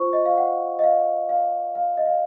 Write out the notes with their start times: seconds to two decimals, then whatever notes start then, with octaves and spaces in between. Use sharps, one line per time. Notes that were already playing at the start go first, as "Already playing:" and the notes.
Already playing: F4 C5 C#6
0.13 D#5
0.26 F5
0.37 F#5
0.79 D#5
0.84 F5
1.29 F5
1.75 F5
1.98 D#5
2.06 F5